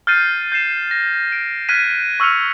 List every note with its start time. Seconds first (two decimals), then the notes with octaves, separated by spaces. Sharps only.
0.07 F6 G6 A6 C7 D#7
0.52 G6 A6 C7 E7
0.91 A#6
1.32 D7
1.69 F6 F#6 G#6 B6 D#7
2.20 C#6 E6 F6 C#7 F7